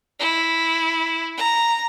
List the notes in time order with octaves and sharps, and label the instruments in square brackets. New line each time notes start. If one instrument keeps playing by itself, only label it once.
[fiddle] E4
A#5